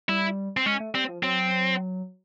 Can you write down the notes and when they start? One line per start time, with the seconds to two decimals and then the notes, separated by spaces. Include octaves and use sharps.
0.09 G3 E4
0.57 C4
0.66 G#3 C#4
0.80 A3
0.94 G3 C4
1.09 F3
1.23 F#3 C4